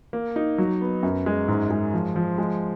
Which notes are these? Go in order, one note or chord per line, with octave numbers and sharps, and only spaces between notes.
A#3
D#4
F#3
B3
F#2
G#3
G#2
G#3
F3
F3
G#3